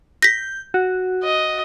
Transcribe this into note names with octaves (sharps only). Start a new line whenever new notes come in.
G6 A#6 B6
F#4
D#5